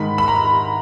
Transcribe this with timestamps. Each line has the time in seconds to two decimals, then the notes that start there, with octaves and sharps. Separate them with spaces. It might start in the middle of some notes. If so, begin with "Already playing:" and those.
Already playing: G#2 D#3 G#3 B5
0.18 B5
0.28 A#5